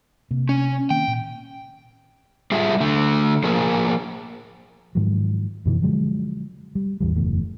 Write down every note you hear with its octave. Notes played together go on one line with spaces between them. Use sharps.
C3 A#3
C#4
D#3 A#3 C4 G5
A#2
G3 F4 G#4 E5
D3 A3
F3 A#3 G#4 A#4
G#2 D#3 F3 F#3
F#2 B2 D#3 E3
D3 F3 F#3 G#3
G3
A1 E2 E3 G3
F#1 E2 A2